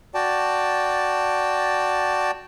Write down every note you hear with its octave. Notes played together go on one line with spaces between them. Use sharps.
F#4 D5 G5 A5